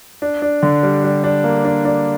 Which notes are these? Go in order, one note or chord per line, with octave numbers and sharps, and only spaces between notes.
D4
D4
D3
G3
G3
D4
A#3
D4
D4